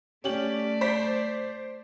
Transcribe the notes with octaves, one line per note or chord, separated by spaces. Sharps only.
A3 C#4 G4 D5 F#7
C5 B6